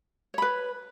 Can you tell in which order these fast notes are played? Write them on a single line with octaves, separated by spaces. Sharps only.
C#5 B5 B4